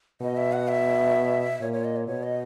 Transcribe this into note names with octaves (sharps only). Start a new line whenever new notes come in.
B2 D#5
E5
F#5
E5
A#2 C#5
C#5
D#5
C#5
B2 C#5
D#5